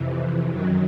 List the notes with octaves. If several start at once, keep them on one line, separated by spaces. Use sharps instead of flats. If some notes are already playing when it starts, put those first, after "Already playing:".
Already playing: F2 C3 E3
F#2 D#3 F#3